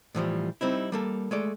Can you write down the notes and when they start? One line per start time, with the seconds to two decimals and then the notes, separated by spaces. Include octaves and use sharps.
0.15 A2 E3 F3 G3
0.61 G3 C4 D#4 E4
0.92 G3 A#3 A4
1.31 G#3 A3 D5